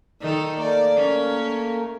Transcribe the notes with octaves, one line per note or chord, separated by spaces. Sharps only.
D#3 D#4 A4
A3 A#3 A#4 D5
C#4